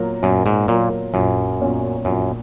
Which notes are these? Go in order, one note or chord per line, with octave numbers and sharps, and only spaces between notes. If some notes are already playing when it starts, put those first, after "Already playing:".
Already playing: A#2 F#3 A#3 F4 A#4
F#2 A#2
G#2
A#2 F#3 A#3 F4 A#4
A#1 F#2
A#2 F#3 C#4 F4
A#1 F#2